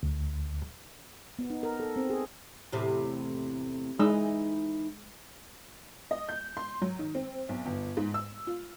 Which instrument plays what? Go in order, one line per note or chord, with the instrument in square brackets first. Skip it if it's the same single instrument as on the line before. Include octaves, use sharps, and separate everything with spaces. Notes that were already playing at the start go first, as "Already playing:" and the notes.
[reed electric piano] D2
[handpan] B3
D#4
A#4
A4
C4
G#4
[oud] E2 A2 C3
[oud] E3 D#4 E5 [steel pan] G#3
[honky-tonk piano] D#5
G6
C6
F#3
D#3
C4
B1
G1
G#2
E6
F4